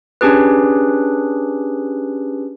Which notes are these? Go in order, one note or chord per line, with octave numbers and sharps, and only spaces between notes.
C#4 D4 G4 G#4 B4